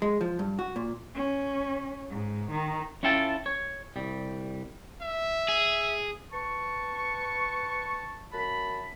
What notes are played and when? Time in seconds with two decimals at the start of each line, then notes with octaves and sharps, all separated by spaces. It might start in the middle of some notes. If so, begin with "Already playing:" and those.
0.02 G#3
0.21 F3
0.39 G2
0.59 F#4
0.76 A#2
1.15 C#4
2.09 G#2
2.51 D#3
3.03 C#4 E4 F4 A4 G5 A5
3.46 C#5
3.96 C2 G3
5.01 E5
5.49 G#4
6.32 B4 A5 C#6
8.32 F#2 A5 B5